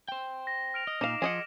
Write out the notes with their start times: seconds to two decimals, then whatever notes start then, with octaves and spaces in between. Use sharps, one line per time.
0.08 C5 G5
0.47 A#6
0.74 F6 D7 F7
0.87 D#5
1.01 A#2 D#4 F5 D6 E7
1.22 F3 G#4 D#5 F#5